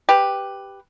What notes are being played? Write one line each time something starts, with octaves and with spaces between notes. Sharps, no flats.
G4 B4